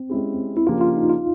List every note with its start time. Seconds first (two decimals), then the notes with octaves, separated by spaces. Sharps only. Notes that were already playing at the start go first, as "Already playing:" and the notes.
Already playing: C4
0.10 G#3 C#4 E4 G4
0.57 E4
0.66 C#3 F3 A#3 D4 F4 G4
0.81 F4
0.96 D#4
1.10 F4